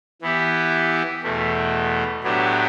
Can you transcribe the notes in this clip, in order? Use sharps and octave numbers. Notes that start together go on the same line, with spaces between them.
E3 B3 E4 G4
E2 B2 A3
A2 F#3 B3 D4 G4